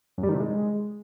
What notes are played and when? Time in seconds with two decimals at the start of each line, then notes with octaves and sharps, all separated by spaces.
0.18 F#2
0.23 G3
0.29 D#3
0.34 C3
0.40 G#3